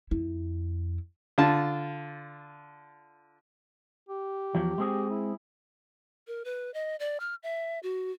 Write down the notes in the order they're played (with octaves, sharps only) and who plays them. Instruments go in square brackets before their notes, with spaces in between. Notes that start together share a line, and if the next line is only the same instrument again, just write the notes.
[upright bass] F2 E4
[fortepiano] D3 F4 A5
[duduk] G4
[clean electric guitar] E2 F3 F#3
G#3 C4 G#4
[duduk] E4
[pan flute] A#4
B4
D#5
D5
F6
E5
F#4